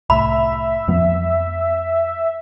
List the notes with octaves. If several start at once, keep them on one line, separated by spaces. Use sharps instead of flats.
C2 A2 E5 B5
F2 F3 B3